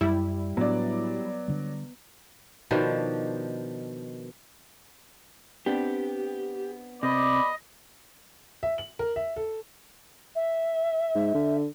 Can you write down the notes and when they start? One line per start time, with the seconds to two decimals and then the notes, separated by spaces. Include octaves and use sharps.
0.01 F#2 G3 E4
0.57 A2 F#3 B3 D4 D5
1.48 D3 G3
2.71 B2 D#3 F3 D4
5.66 B3 C4 D4 G4
7.03 C3 D5 D#5 B5
8.63 E5
8.78 F#7
8.99 A#4
9.16 E5
9.36 A4
10.35 E5
11.15 G#2
11.35 D3